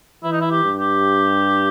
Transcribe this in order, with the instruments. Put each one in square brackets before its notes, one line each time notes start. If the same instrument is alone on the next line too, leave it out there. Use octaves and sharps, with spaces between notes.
[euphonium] E3 [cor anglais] E4
[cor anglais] D#4
E4
G4
[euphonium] G2
[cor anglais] G4